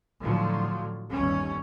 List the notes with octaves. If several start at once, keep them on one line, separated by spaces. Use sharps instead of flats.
A2 D3 F3 F#3
G1 D#2 C#4